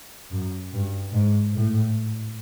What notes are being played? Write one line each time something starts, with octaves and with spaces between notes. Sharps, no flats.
F#2
G2
G#2
A2